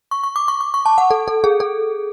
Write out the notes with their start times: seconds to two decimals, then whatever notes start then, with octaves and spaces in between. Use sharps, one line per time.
0.11 C#6
0.23 C#6
0.36 D6
0.48 C#6
0.61 D6
0.74 C#6
0.86 A5
0.98 F#5
1.11 A4
1.28 A4
1.44 G#4
1.60 A4